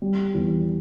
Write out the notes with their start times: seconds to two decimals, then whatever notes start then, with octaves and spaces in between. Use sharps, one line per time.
0.02 G3
0.34 E2